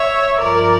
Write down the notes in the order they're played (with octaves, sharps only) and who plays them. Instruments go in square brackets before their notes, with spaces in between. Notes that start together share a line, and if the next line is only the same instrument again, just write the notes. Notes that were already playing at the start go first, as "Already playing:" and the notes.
Already playing: [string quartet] C#5 E5
G2 F3 A#4 D5